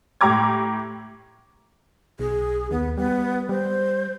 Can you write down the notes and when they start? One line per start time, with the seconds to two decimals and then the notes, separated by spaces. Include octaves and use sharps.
0.21 A2 G4 A#5 D6 G#6
2.19 B1 G#4
2.71 D#2 B3
2.97 G3 B3
3.49 G3 C5